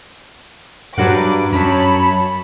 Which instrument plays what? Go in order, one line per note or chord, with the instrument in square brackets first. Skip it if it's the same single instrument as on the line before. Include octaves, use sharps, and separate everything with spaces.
[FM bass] G2 [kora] F#3 A#4 F#5 [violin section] B4 D6
[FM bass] F#2 [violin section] C#5 A5 B5